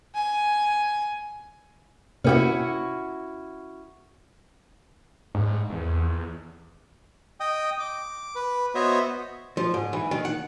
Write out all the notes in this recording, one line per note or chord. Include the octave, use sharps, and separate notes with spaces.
G#5
C3 A#3 C#4 E4 F#4 G4
G#2
E2
D#5 G5 D#6
D6
B4
B3 F#4 C5 C#5 D#5 E5
F3
G#2
E3
D#3
F#5